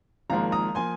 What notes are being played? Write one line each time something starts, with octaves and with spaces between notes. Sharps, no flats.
G#1 G#2 F3 A#3 F5 A#5
A#5 D#6
F3 A#3 G#5 C6